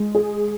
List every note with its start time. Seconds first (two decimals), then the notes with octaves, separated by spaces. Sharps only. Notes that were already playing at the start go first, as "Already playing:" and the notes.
Already playing: G#3
0.15 G#4